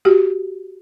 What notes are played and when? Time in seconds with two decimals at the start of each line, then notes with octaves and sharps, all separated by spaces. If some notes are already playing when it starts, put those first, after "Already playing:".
0.05 F#4 G4